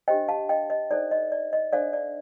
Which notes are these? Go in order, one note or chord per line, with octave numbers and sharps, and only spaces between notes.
D4 G4 C5 D#5 G5
F5 A5
D#5 G5
D#5
D#4 A4 C5 D5
D#5
D5
D#5
D4 A4 C5 D5 F5
D5